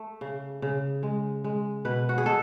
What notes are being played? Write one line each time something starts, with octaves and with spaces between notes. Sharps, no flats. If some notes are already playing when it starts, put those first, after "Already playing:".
Already playing: A3
C#3
C#3
G#3
G#3
B2 B4
F#4
G#4
B2 A4